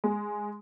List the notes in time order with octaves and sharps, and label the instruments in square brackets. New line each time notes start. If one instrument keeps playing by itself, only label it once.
[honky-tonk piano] G#3